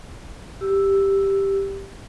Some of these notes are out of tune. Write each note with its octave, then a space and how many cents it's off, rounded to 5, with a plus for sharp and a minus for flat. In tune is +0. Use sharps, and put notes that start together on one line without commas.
G4 +0 E6 +0